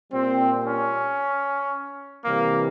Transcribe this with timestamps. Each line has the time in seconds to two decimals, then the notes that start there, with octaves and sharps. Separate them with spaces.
0.12 A#2 G3 C4
0.65 C#4
2.25 C3 E3 G3 A#3